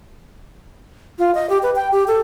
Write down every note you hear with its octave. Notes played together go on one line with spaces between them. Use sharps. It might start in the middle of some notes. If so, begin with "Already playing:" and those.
F4
D#5
G4
B4
G5
G4
A4